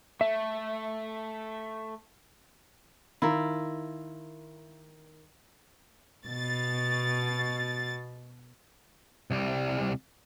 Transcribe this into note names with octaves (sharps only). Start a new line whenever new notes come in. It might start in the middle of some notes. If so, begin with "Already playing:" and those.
A3 E5
D#3 E4 F4 A#4
B2 A6
C2 G3